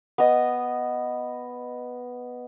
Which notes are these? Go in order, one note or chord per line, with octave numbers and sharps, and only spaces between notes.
B3 D#5